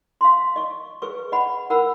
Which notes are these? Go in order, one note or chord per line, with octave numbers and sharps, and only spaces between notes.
F5 C6
D#5 C#6
G#4 B4 C#6
D#5 F#5 B5
A#4 F#5 B5 E6